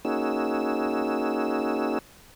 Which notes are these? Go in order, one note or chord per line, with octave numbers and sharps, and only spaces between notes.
A#3 C#4 D#4 F#4 G#4 E6